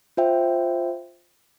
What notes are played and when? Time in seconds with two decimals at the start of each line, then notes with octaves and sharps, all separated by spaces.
0.17 F4 C5 E5 G5